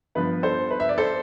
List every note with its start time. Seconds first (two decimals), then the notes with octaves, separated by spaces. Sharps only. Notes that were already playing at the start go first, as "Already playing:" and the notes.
0.15 G2 F3 B3 B4
0.43 A4 C5
0.71 B4
0.80 E5
0.89 D5
0.98 A4 C5